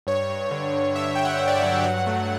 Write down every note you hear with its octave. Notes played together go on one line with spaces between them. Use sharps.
G2 C#5
G2
D3
G2
D3 E5
G2 G5
F#5
G2
D5
E5
F#3
G2 F#5
A3